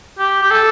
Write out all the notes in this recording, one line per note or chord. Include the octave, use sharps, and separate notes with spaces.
G4
G4
A4